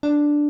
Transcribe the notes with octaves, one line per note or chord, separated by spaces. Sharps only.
D4